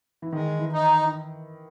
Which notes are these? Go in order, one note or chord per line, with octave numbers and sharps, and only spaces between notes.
E3
D#3 G#3
E3
D#4